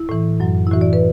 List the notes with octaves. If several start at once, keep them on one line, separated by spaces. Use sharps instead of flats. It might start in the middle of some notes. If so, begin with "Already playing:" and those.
Already playing: E4
A2 E3
F#2 F#3
E4
A2 E3 F#4
D5
B4